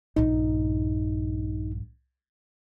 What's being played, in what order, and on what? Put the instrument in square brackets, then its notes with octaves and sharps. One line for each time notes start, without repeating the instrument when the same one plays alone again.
[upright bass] A#1 G2 [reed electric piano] D#4